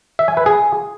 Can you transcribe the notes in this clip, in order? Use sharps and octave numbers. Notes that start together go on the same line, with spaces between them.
E5
G#5
B4
G#4